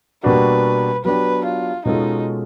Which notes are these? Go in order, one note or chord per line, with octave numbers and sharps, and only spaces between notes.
B2 G3 A#3 D4 F#4 B4
F#3 B3 D4 G4 B4
F4
B2 G#3 C#4 D#4 F4 A4